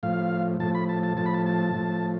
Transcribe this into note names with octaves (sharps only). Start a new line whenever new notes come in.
A2 F3 F5
A2 F3 A5
B5
A5
A5
A2 F3 A5
B5
A5
A5
A2 F3